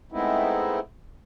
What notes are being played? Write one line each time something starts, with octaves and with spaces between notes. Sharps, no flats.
G#3 A3 B3 C4 D#4 E4